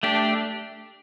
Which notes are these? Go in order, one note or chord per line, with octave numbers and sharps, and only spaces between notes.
A3 D4 G4